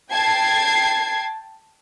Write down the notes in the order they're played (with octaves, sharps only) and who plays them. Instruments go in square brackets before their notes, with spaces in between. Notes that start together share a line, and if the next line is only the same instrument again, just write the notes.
[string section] G5 A5 G#6 C7